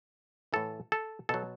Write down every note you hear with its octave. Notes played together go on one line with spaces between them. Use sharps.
A2 E3 A4
A4
B2 F#3 A4